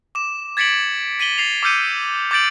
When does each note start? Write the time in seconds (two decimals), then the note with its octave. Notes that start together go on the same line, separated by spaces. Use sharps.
0.15 D6 E7
0.57 G#6 A6 B6 C#7 D7 F#7
1.20 B6 D#7 F#7 G7
1.38 A6 C7 F7
1.63 D6 E6 F6 G6 C#7 D#7
2.31 D6 G6 A6 D7 F#7